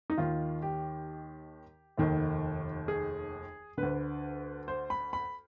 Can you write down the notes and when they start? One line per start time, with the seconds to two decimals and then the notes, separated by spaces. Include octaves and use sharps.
0.10 D#4
0.18 D#2 D#3 F4
0.62 G4
1.98 F1 D#2 D#3
2.88 G#4
3.77 D2 D3 B4
4.68 C5
4.90 B5
5.13 B5